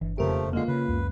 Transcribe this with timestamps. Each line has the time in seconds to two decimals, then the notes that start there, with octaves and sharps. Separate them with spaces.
0.01 G1 E3
0.18 E1 F2 C#3 F3 A3 G4 A#4
0.53 D3 G#3 A#3 F4
0.68 C#3 B4
0.88 C#2 F#2